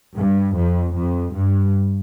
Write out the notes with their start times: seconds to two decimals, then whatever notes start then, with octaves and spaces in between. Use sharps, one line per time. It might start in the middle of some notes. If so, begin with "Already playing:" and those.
0.16 G2
0.55 F2
0.95 F2
1.34 G2